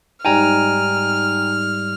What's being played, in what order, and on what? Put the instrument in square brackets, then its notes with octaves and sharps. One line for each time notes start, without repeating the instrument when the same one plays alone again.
[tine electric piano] G#2 G3 D#4 [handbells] G5 G#5 A#5 [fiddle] F6